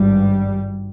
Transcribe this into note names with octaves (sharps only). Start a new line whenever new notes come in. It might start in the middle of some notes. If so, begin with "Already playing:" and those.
Already playing: G#1 G2 G3